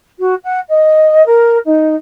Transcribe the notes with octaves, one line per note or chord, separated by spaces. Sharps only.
F#4
F#5
D#5
A#4
D#4